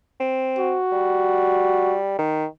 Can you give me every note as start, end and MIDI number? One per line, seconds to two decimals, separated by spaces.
0.20 0.77 60
0.59 1.97 66
0.92 2.17 55
2.18 2.45 51